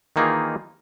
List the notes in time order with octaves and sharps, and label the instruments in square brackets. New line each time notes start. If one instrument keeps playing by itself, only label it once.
[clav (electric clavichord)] D#3 E3 A#3 D#4 F4 G#4